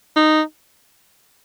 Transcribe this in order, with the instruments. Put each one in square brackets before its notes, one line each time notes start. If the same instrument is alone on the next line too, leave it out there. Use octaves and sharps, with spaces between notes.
[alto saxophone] D#4